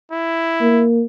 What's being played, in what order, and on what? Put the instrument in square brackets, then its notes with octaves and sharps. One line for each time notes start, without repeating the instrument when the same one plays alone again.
[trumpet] E4
[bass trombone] A#3